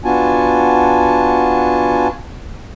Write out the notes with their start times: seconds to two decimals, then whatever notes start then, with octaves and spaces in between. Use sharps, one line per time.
0.04 B3 D4 F4 F#4 G#5 A5